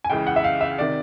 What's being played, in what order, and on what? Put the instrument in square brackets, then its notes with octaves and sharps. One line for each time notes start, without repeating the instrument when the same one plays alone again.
[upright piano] G#5
C#2 C#3 E3 G5
F#5
E5
F5
E5
C3 D#3 D5